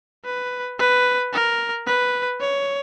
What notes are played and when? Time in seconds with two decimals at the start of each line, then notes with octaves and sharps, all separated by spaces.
0.25 B4
0.79 B4
1.33 A#4
1.87 B4
2.40 C#5